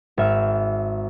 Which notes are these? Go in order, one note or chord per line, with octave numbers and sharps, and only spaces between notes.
G#1 E5 F6